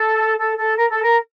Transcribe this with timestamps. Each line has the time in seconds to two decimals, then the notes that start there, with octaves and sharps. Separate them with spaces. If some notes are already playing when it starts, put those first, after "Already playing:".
Already playing: A4
0.37 A4
0.57 A4
0.76 A#4
0.89 A4
1.03 A#4